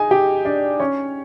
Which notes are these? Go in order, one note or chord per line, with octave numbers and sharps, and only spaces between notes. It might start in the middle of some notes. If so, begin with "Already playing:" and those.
Already playing: D#4 G#4 D#5 G#5
G4 G5
D4 D5
C#4 C#5